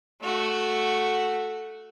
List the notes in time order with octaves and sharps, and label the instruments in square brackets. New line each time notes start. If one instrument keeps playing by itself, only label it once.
[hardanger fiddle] A3 F#4